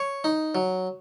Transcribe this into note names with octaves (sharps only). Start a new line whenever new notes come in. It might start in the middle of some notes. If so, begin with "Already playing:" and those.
Already playing: C#5
D#4
F#3